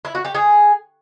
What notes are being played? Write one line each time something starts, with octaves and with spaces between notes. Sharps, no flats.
E4
F#4
G4
G#4